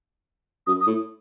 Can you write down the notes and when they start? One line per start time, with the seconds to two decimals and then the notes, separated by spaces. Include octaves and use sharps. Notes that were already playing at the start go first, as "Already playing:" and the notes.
0.66 F#2 D#6
0.80 D#6
0.86 A2